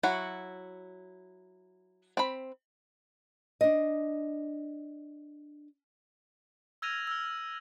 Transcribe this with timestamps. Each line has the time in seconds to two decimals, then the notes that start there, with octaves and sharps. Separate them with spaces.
0.03 F#3 E4 F#4
2.17 C4 B5
3.61 D4 D#5
6.82 E6 F6 G#6 A#6 D#7 F7
7.07 E6 F6
7.38 E6